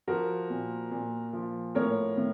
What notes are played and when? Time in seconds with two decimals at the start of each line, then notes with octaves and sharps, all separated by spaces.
0.07 F3 F#4 A#4
0.50 A#2
0.91 A#2
1.33 F3
1.75 A2 A#4 C#5
2.17 A2